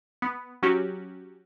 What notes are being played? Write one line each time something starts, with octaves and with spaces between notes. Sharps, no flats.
B3
F#3 C#4 F#4 G4